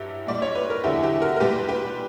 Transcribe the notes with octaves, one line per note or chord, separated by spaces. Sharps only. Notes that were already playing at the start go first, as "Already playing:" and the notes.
Already playing: G2 F#3 E4 G4
A#2 G3 D5
C#5
B4
A#4
E2 D3 F#3 E4 G4
E4 G4
F#4 A#4
A#4
A#2 G3 G4 B4
G4 B4